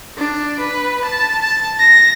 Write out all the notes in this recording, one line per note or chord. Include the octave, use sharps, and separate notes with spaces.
D4
B4
A5
A5
A#6